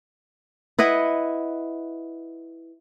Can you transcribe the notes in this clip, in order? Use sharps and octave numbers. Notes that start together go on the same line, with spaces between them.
E4 B4 D#5 F#5